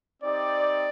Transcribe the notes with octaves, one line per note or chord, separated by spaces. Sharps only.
C4 D#4 G4 D5